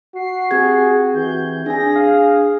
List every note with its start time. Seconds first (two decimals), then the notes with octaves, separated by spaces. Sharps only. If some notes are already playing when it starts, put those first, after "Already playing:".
0.15 F#4 C7
0.51 C4 G4 G#4 G#6
1.14 E3 G6
1.66 D4 G#4 G#5 A#6
1.96 F5